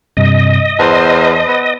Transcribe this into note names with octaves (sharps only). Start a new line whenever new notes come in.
G2 C3 D#5
E2 C5 A5
B3